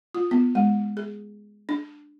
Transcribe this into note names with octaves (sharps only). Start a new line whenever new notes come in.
F4
B3
G#3
G#4
D4